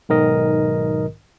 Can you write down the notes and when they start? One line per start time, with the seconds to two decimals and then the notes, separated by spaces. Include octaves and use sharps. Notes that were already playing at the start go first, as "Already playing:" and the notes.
0.09 B1 G#2 D#3 A#4 D#5